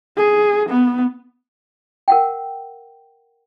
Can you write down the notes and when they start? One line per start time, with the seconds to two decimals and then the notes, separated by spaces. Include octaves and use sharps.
0.17 G#4
0.70 B3
2.08 A#4 F#5 G5